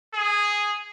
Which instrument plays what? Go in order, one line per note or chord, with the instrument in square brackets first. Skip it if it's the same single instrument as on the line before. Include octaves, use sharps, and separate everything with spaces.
[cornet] G#4